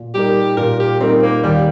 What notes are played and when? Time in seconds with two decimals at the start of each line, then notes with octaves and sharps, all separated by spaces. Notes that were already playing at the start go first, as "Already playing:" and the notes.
Already playing: A#2
0.14 G3 D#4 G4 A#4
0.57 A#2 A#4
0.80 G4
1.00 G3 C4 D#4 A#4
1.23 A#3
1.43 D#2 G3